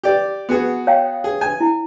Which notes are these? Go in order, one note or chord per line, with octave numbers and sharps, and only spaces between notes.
G4 D5
B3 F#4 G#4
C#5 F5 G5
G#4
G#5
E4